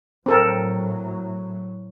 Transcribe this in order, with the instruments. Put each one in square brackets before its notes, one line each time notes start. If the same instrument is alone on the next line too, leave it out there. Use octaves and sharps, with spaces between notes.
[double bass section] A2 F#3 [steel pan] C4 A4 A#4